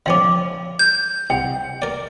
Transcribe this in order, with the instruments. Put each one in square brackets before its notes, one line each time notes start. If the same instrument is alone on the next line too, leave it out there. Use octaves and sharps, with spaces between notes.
[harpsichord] D3 F3 C#4 [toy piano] F5 G5 D6
[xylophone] G6
[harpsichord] C2 [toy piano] F#5 G5
[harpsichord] A#4 D5